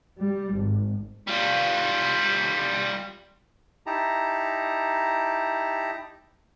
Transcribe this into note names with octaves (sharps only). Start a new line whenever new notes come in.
G3
G#1
G3 F4
D#4 E4 G4 A5 A#5